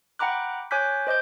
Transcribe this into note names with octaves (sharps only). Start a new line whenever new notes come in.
F#5 G5 A#5 B5 D6 F#6
C#5 G#5 D6 F#6 G6 B6
C5 D#5 D6 G6